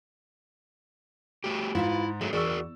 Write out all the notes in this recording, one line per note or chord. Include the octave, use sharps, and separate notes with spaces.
A3 F#4 G4
G#2 E4 F4 B4
F#3 G#3 A3
E2 F#4 G#4 A#4 D5 C#6 E6